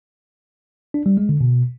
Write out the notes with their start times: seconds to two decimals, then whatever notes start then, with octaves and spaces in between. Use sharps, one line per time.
0.94 D4
1.06 G3
1.17 G#3
1.29 D3
1.41 B2